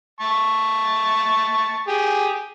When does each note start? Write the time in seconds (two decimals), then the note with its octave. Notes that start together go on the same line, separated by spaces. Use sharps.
0.20 A5 C#6
1.88 G4 G#4